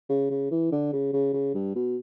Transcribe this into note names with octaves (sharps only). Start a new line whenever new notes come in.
C#3
C#3
E3
D3
C#3
C#3
C#3
G2
B2